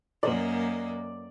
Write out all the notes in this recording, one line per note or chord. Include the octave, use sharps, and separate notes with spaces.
F#2 A#3 D5 D#5